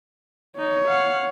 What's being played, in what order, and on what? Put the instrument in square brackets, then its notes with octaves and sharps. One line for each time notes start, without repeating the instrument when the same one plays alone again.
[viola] D#4 [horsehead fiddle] C#5
[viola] F5 F#5